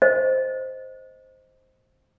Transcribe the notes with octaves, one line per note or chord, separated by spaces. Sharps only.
C5 D#5